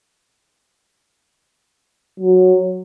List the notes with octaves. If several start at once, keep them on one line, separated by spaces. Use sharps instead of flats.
F#3